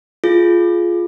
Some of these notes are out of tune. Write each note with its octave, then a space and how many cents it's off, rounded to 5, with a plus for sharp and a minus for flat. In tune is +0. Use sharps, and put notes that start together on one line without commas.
F4 +0 G#4 +20